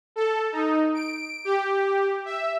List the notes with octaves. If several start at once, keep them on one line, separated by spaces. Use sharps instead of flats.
A4
D#4
D7
G4
E5